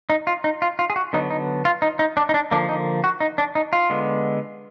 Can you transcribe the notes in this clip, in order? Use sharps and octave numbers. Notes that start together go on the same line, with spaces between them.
D#4
F4
D#4
F4
F4
G#4
F#4
D3 F#3 B3 D#4
D#4
F4
D#4
D#4
D4
D#4
D4
D3 F3 A#3 D4
D#4
F#4
D#4
D4
D#4
F4
D3 G#3 B3